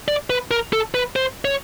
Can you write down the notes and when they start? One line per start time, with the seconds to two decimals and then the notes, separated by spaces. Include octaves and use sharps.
0.08 D5
0.30 B4
0.51 A#4
0.73 A4
0.94 B4
1.16 C5
1.45 C#5